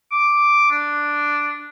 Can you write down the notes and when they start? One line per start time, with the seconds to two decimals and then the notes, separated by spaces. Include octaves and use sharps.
0.12 D6
0.71 D4